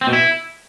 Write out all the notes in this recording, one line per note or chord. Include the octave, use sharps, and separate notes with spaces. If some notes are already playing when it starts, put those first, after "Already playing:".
C4
B2
E4